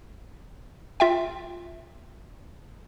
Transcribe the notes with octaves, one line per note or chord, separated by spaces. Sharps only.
F4 E5 G5